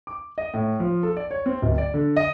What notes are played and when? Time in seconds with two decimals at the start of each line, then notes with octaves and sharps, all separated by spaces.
0.07 D6
0.38 D#5
0.54 A2
0.80 F3
1.03 A4
1.17 D5
1.31 C#5
1.46 C4
1.62 D1
1.78 D5
1.94 D3
2.16 D#5